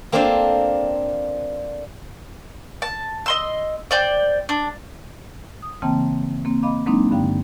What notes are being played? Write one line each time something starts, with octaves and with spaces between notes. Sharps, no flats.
A#3 C4 D4 F4 A4 C5
A5
D#5 C6 E6
C5 D5 G5
D4
D#6
C#3 E3 A#3 C4 G5 A5
A#3 C4
D#5 F5 B5 D6
F#3 G#3 A#3 C4 D4 D#4
G2 D3 F5 G5